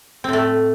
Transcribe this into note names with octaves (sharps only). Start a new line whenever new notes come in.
A2 A3 C4